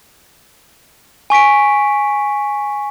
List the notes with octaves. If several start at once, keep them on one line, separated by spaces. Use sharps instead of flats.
G#5 C#6 B6 D7